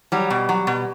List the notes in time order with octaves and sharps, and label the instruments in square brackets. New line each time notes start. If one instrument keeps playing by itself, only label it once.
[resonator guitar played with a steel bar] F#3 G3
B2
F#3
B2